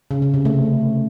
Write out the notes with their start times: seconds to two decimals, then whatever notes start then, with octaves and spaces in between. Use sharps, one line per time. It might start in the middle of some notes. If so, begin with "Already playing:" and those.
0.11 C#3
0.22 C#3
0.34 C3
0.45 A3